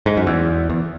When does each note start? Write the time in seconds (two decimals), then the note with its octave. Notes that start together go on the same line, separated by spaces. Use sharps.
0.06 G#2
0.17 F#2
0.27 E2
0.70 E2